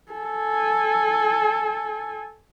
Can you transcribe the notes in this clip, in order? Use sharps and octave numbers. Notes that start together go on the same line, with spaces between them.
A4 G#5